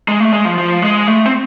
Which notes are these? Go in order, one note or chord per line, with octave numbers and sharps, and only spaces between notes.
G#3
A3
G#3
F3
F3
G#3
A3
C4